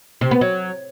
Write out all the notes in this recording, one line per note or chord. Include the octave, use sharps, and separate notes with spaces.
C3
B3
F#3